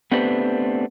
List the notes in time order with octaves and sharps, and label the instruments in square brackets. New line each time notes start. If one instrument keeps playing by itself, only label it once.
[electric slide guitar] A3 B3 C4 D4 G4 B4